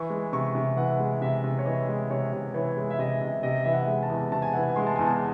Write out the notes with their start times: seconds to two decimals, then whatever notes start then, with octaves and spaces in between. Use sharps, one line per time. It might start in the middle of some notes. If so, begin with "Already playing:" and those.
Already playing: E3 C#6
0.10 G#3
0.33 C3 C#6
0.55 C3
0.77 E3 F#5
1.00 G#3
1.22 C3 E5
1.44 C3
1.59 C#5
1.65 E3 D#5
1.89 G#3
2.10 C3 C#5
2.33 C3
2.54 E3 C#5
2.77 G#3
2.90 E5
2.99 C3 D#5
3.21 C3
3.43 C3 D#5
3.64 E3 E5
3.73 F#5
3.87 G#3
4.03 A5
4.10 E2
4.32 C3 A5
4.42 G#5
4.53 E3 F#5
4.63 G#5
4.76 G#3 C6
4.87 A5
4.96 E2 G#5
5.07 A5